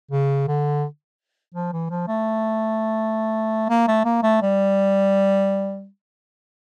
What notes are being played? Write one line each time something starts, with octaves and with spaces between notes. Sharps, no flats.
C#3
D3
F3
E3
F3
A3
A#3
A3
A#3
A3
G3